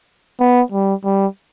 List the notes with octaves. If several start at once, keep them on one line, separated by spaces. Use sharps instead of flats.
B3
G3
G3